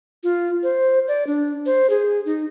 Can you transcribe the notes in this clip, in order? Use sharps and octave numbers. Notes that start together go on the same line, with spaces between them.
F4
C5
D5
D4
C5
G#4
D#4